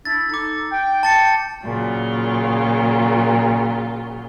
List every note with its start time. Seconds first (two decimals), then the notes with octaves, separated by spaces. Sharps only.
0.05 D4 E4 A6
0.30 D#4 A4 D6 A6
0.72 G5
1.03 A5 A6 C#7
1.64 A#2 C#3 F#3 F4